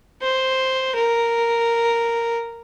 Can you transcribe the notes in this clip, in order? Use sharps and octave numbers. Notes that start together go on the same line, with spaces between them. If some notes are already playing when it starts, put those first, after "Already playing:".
C5
A#4